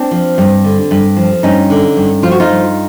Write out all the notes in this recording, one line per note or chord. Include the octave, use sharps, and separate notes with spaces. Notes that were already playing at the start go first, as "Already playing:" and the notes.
Already playing: C4 D4
F3
G2
D3
G2
F3
G2 C#4 D#4
D3
G2
F3 F4
F#4
D#4 F4
G2